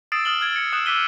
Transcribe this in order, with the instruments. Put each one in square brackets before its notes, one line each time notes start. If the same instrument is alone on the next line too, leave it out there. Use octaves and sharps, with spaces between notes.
[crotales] D#6 E6 A6 C7 D7 E7
D#6 F6 E7 F#7 G7
F6 G#6 D7 F#7
A6 C#7
D#6 E6 F#6 E7
D6 E6 F#6 B6 D#7 G7